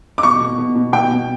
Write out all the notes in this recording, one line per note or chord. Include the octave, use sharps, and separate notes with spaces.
D6
B2 C#6
B2
B2
B2
B2 G5
B2